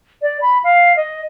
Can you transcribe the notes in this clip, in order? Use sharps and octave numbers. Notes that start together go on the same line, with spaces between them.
D5
B5
F5
D#5